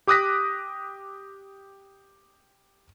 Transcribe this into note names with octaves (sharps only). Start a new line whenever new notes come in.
G4 D6 D#6 F#6 A#6 B6